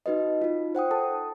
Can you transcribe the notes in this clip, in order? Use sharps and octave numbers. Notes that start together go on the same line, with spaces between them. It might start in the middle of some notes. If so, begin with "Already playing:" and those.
D#4 F#4 B4 D#5
D#4 F4
C5 F#5 G5 D#6
A4 A5 D#6